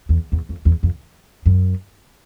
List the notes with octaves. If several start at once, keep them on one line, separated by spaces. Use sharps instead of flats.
E2
E2
F2
E2
F2
F#2